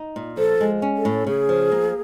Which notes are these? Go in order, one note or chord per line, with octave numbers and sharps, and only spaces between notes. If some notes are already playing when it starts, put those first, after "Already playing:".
Already playing: D#4
A#2
F3 A4
G#3
C#4
A4
A2
C#3 G#4
F3
A#3